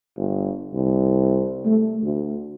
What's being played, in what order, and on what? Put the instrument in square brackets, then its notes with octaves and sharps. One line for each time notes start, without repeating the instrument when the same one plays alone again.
[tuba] G1
C2
A3
D2